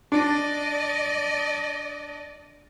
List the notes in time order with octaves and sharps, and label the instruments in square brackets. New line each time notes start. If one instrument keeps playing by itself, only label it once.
[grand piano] D4 [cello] D5 D#5